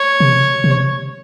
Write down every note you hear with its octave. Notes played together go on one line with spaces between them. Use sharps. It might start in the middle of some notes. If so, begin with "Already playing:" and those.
Already playing: C#5
C3
C3